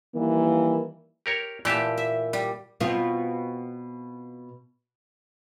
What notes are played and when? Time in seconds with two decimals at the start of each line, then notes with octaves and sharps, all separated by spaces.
0.15 D#3 E3 G3 A#3
1.26 G4 A#4 C#5
1.65 A#2 E3 G4 E5 A5
1.97 E5
2.33 G3
2.80 B2 C4 F4